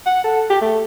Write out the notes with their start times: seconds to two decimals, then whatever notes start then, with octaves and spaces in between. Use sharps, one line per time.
0.06 F#5
0.24 A4
0.50 G4
0.62 A3